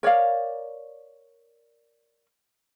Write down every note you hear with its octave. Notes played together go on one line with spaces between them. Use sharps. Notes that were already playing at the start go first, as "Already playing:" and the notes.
A#4 C#5 D5 F5